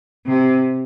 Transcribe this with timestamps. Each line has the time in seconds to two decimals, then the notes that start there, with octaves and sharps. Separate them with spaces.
0.26 C3